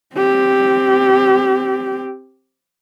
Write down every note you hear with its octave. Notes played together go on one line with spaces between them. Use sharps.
C4 G4